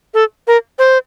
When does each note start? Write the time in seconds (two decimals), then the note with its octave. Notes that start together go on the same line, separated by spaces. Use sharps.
0.14 A4
0.47 A#4
0.79 C5